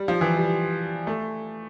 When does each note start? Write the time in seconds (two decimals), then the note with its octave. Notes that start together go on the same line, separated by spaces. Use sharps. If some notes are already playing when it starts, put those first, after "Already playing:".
Already playing: G3
0.08 F3
0.21 E3
0.37 G3
1.07 A3